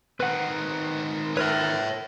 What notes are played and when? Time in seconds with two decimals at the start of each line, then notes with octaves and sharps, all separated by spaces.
0.20 D#3 C4 B4 F#5
1.37 A#4 B4 C#5 E5